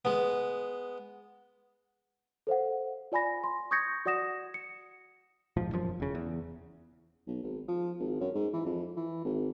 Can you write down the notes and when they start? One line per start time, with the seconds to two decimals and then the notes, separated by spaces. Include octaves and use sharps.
0.05 G#3 B3
2.47 A4 C5 F5 F#5
3.12 F4 D5 G#5 B5 A#6
3.44 C6
3.71 C#6 D#6 G6 G#6 A#6 C#7
4.06 F#4 D5 F#5 D#6 A#6 E7
4.54 C#7
5.57 D1 A#1 G#2 F3
5.72 E1 F#2 F3
6.00 E1 C#3
6.15 E2
7.27 B1
7.43 G#1
7.68 F3
7.99 G#1
8.20 F#2
8.34 G#2
8.53 E3
8.65 F2
8.97 E3
9.25 G#1